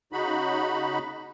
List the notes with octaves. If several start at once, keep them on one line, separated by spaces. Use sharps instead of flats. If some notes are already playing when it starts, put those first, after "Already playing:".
C#3 D#4 F#4 B5